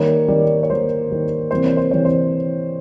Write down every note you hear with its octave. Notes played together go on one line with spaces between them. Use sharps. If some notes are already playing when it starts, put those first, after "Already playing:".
Already playing: D#3 G3 A#3 C#5
D#3 G3 A#3
C#5
D#3 G3 A#3 C5
D#3 G3 A#3
C3 E3 G3 A#3 C5
C#5
C5
C3 E3 G3 A#3 C#5
C5